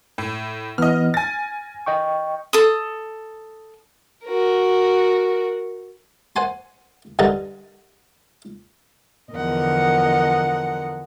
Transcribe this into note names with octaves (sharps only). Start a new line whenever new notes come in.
A2
E3 B3 D#5 F6
G#5 A6 A#6
D#5 G5 C#6
A4 D#6
F#4 A#4
C5 F#5 G#5 C6
G2 D3 D#4 D#5 A5 A#5
E2 D3 F3 A#4 D#5 F#5